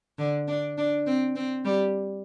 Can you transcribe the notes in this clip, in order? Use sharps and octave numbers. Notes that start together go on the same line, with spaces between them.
D3
D4
D4
C4
C4
G3